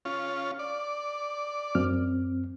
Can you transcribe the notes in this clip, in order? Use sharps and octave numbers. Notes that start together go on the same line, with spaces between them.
C#4 F4
D5
F#2 C4 F6